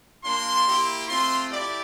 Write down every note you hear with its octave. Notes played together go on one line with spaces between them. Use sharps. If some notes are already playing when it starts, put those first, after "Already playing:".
A#3 D4 F4 C6
A#3 E4 G4
A3 C4 F4 C6
A3 E4 G4 D5